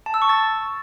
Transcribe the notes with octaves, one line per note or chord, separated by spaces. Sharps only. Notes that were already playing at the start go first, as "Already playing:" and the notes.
A5
E6
C#6
A6